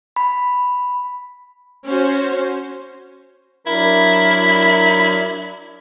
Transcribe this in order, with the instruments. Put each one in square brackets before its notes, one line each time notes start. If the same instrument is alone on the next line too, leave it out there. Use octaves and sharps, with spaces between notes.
[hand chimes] B5
[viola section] C#4 F#4 C5
[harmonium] F#3 D4 [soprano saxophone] E4 [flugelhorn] A#4 [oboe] B5